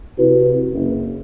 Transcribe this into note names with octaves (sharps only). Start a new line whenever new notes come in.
C3 E4 F#4 B4
F#1